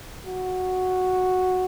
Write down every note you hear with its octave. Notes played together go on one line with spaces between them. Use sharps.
F#4